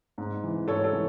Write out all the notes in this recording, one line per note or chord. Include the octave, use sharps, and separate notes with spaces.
G#2
E3
G#2 A4 C#5
A4
E3